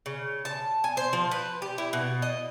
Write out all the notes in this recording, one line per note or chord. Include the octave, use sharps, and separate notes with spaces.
C#3
A5
G#5
C5
F3
B4
G4
E4
B2
D#5